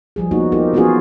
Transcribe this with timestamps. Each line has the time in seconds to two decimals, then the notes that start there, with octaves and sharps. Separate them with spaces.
0.16 F3 G3 G#4
0.31 A#3 B3 D#4 F#4
0.52 D#4 F4 G4 A#4
0.74 E3 B3 C#4 F4 F#4 G#4